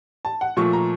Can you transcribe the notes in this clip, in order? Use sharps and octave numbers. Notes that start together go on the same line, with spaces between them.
A5
F#5
A#2 F3 A3 C#6
A#5